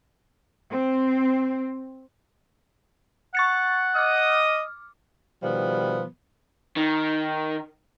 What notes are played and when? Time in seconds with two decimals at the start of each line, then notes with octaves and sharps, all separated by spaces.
0.71 C4
3.35 F#5 C#6 A6 C#7
3.96 D#5 D6 D#6 F6
5.43 B2 D#3 F3 G3 B3
6.76 D#3